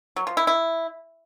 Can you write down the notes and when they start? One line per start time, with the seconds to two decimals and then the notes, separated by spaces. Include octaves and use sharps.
0.16 F#3
0.27 F3
0.37 E4
0.47 E4